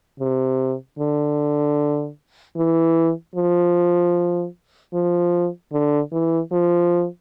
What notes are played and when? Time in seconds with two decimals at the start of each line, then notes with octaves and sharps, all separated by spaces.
0.20 C3
0.99 D3
2.57 E3
3.36 F3
4.93 F3
5.73 D3
6.12 E3
6.51 F3